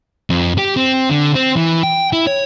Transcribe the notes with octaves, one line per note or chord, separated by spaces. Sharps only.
F2
G4
C4
D3
C4
E3
G5
E4
C#5